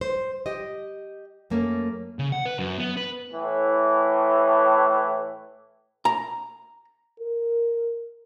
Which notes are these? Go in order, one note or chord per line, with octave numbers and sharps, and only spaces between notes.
C5
G4 D#5
F#2 A3 A#3 C#4
C#3
F#5
B4
F#2
B3
B4
A2 E3
A#5
A#4